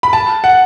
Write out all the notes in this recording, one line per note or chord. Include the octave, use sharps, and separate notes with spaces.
B5
A5
F#5